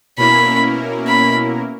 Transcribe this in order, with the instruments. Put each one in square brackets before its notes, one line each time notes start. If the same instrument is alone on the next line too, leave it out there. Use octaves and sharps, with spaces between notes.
[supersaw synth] B2 A#3 C#4 E4 A#4 [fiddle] B5
[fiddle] B5